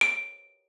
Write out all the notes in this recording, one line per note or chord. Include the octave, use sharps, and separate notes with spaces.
D7